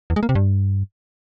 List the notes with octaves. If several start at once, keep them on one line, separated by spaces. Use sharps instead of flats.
E2
G#3
A#3
C3
G2